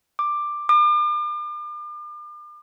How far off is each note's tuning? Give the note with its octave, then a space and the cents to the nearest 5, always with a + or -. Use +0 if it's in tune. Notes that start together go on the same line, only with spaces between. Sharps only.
D6 +10
D6 +40